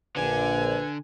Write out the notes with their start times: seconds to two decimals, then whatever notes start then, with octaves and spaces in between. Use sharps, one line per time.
0.16 A#1 D3 B4 G#5